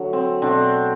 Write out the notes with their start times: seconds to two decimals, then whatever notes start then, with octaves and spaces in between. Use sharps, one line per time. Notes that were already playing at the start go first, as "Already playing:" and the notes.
Already playing: D3 F#3 A3
0.13 C4
0.42 B2 F#3 A3 C4 D4